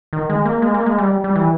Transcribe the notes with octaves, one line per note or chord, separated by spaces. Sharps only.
D#3
G#3
A#3
G#3
A#3
G#3
G3
G3
E3